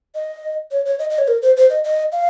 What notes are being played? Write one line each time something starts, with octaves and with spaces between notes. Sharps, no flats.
D#5
C#5
C#5
D#5
D#5
C#5
A#4
C5
C5
D#5
D#5
F5